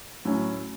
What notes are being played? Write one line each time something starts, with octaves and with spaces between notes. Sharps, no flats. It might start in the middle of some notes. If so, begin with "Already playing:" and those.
A2 F#3 C#4